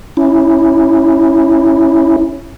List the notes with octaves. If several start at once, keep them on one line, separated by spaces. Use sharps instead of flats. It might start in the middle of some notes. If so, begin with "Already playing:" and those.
C#4 E4